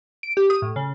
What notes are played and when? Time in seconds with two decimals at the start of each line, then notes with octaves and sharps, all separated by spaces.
0.23 D7
0.37 G4
0.50 D#6
0.62 A2
0.76 C#3